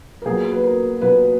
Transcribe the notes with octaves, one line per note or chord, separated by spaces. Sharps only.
A#4
A#2 F#3 B3 G#4
B4
A#4
A#2 F#3 B3 B4